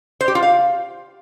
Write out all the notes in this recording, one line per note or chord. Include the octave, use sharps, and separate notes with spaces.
C5
G4
F4
F5